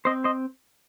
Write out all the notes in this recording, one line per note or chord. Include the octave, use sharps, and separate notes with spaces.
C4 C5 D#5
C5 D#5